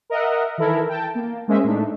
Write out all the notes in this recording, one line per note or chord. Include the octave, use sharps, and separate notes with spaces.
A#4 D#5 E5 F#5
D#3 E3 E4 A4 A#4
G5 A5
A#3
G#3 A#3 C#4 C5 D#5 E5
A2 A3 D4 D#4